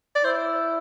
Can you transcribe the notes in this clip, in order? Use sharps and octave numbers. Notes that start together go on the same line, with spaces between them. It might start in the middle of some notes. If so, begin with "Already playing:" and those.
D5
E4 C5